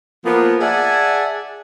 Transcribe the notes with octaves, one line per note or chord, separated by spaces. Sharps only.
F3 A#3 B3
G#4 D5 E5 F#5 G#5 A5